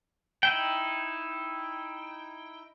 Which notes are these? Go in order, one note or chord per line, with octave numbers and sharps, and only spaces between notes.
D#4 E4 G5